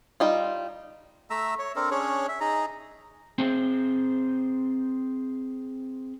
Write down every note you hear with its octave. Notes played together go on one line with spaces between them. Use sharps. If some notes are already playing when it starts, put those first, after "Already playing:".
G3 D#4 F4
A3 E5 A#5 E6
C#5
C4 D4 A4 A#4
C#4 D4 G#4 C#5
E5
D#4 G#4 A#5
C4 G#4 C5 G5